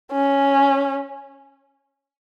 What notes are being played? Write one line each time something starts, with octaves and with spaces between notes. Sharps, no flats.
C#4